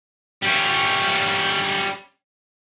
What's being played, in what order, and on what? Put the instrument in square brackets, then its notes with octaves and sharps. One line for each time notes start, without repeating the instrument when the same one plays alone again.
[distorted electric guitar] G3 C#4